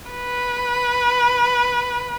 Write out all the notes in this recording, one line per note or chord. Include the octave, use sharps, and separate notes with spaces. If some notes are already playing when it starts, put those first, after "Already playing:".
B4